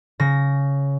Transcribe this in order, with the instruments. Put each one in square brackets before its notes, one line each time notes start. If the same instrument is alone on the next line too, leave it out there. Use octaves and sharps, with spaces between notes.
[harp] C#3 A#6